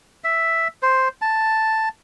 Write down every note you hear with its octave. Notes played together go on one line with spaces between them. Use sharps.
E5
C5
A5